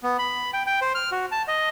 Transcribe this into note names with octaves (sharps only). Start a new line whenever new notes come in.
B3
B5
G5
G5
C5
F6
F#4
A5
D#5